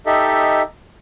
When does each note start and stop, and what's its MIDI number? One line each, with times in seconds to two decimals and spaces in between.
0.06 0.62 63
0.06 0.62 67
0.06 0.62 69
0.06 0.62 75
0.06 0.62 76